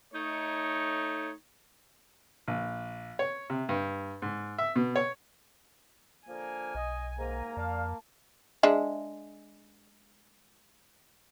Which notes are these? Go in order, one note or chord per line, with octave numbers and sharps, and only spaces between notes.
A3 D#4 C#5
A#1
C#5
C3
G2
G#2
E5
B2
C#5
D3 F3 A#3 G#5
B1 D#5
G#2 A#3 A#5
F2 D5 F5 A5
G#3 D4 E5